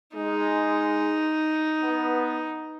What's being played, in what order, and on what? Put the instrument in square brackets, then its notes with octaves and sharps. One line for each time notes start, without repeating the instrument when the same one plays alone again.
[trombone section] G#3 [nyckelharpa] D#4
[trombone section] B3